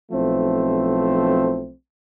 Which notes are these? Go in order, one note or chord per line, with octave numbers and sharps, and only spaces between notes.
B1 F3 A3 C4 E4